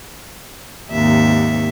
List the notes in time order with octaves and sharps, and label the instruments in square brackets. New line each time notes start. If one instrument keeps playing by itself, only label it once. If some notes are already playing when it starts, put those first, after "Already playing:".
[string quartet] D#2 G#2 C3 E5